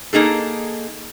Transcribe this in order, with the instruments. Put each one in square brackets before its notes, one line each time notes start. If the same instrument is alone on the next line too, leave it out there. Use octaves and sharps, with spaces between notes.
[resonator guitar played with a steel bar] A#3 D#4 G#4 A4